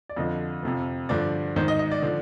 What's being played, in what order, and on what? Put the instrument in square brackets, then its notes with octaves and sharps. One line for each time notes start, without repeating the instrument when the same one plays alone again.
[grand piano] D5
F2 D3 F3 D#5
F2 C3 F3
G2 D3 F3 D5
G#2 D#3 C5
D#5
D#5
D5
D3 F3